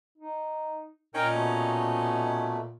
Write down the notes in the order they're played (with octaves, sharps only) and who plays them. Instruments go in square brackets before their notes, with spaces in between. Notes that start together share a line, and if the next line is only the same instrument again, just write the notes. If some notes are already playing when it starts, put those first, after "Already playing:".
[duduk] D#4
[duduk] A#2 [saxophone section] C#4 D#4 [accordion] A#4 G5
[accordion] B2 A3